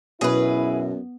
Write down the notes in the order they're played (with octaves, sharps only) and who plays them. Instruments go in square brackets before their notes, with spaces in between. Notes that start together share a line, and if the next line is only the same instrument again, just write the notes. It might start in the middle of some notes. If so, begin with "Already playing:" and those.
[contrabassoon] F#2 [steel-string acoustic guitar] B2 [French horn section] E4 [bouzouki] G#4 B4